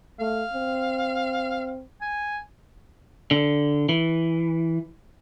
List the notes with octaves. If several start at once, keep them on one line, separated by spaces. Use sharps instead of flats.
A3 F5
C4
G#5
D3
E3